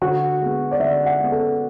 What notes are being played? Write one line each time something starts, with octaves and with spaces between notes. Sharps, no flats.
D3 F#4
G#3 B3
D5
D3 E5
F#5
G#3 B3
A4